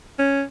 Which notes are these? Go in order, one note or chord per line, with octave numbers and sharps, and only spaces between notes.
C#4